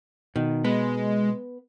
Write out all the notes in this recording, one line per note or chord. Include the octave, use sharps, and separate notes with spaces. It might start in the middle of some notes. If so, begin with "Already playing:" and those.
B2 D#3
G#3 B3